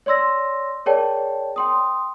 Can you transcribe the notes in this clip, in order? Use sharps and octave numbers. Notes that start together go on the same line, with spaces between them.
C#5 D5 C6 E6 A#6
G#4 A#4 C#5 D5 G5 A5
G5 C6 D#6